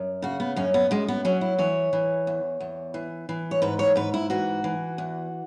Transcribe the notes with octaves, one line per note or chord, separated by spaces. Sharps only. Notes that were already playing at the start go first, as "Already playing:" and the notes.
Already playing: F#2
C#3 F#4
B3
F#2 C#4
B3
F#2 G#3
B3
F#3 C#4
E4
E3 C#5
E3
E2
E2
E3
E3
C#5
G#2 B4
C#5
G#2 B4
E4
E3 F#4
E3
E2